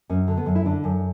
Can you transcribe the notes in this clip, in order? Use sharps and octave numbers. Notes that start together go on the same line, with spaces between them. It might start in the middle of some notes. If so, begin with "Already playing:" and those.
F#2 C#4
D3
B3
F#2
E4
D3 D4
F#2